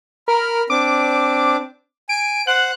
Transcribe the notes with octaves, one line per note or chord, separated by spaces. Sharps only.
A#4 B5 F6
C4 D4 D6
G#5 D7
C5 F#5 F#6